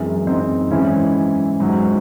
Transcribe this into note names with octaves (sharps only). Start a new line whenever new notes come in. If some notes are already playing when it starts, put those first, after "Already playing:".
Already playing: F#2 E3 G#3 C4
C4 D#4
G#2 E3 C#4 E4
G#2 F#3